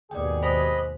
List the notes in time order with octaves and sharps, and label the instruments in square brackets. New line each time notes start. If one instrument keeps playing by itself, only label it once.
[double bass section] D#2 G#2 B2 [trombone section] G4 G#4 [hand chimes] D5 G5
[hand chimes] C5 [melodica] D#5 B5